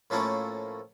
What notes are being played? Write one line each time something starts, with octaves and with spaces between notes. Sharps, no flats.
A2 F3 A3 A#3 C#4 E4